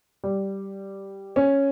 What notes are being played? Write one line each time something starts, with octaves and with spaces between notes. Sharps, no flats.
G3
C#4